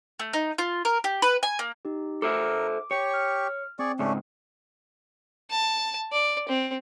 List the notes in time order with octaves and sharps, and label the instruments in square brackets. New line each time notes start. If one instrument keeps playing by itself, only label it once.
[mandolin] A3
D#4
F4
A#4
G4
B4
G#5
A#3
[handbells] D#4 G4
[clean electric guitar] A4 C5 E5 [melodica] A#4 [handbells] D6
[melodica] G4 C#6 [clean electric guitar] C#5
[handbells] F6
[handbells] C4 [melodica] G#4 D5 C#6
[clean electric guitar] C#2 G#2 [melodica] A3 C#4 D4
[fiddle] A5
D5
C4